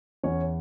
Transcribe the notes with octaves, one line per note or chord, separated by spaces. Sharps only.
E2 C#4 C#5